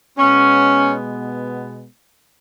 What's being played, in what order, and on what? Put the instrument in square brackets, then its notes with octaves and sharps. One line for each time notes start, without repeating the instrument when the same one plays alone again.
[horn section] B2 G#3 B3 C#4